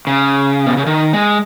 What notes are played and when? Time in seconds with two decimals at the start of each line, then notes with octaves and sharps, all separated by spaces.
0.07 C#3
0.66 B2
0.77 C#3
0.86 D#3
1.13 G#3